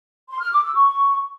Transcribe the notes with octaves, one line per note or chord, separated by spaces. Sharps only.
C6
F6
D6
E6
C#6